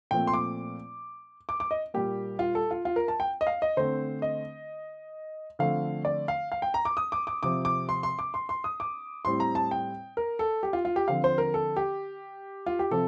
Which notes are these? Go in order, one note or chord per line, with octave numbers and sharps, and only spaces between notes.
A#2 F3 A3 C4 G5
C6
D6
D6
D6
D#5
A#2 G3 A#3 G4
F4
A4
F4
F4
A#4
A5
G5
D#5
F5
D#5
D3 A3 C4 C5
D#5
D3 F3 A3 C4 F5
D5
F5
F5
G5
A#5
D6
D#6
D6
D6
C3 F3 C4 D6
D6
C6
C6
D6
C6
C6
D#6
D6
A2 G3 C4 C6
A#5
A5
G5
A#4
A4
G4
F4
F4
G4
D3 F3 C4 F5
C5
A#4
A4
G4
F4
G4
C3 F3 C4 A4